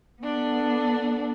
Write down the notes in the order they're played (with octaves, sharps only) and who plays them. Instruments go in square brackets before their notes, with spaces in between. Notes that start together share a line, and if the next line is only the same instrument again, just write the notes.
[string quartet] B3 A4 [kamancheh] D4